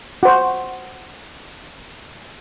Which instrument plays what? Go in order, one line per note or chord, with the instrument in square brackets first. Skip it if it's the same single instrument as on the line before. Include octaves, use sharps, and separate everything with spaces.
[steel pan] F#4 C5